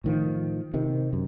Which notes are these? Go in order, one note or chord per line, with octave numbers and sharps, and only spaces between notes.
A2 D#3 F3
C3 D#3
F#2